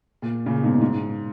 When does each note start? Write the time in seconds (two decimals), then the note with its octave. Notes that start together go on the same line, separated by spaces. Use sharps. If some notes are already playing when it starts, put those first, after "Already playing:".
0.22 A#2
0.46 A#2 C#3
0.63 G#2 B2
0.81 G#2